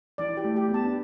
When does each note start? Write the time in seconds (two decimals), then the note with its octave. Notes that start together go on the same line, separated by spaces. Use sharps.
0.18 E3 D5
0.37 G4
0.44 A3
0.56 G4
0.69 B3
0.74 A5
0.85 D4